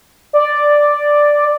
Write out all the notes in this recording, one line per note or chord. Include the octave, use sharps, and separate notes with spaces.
D5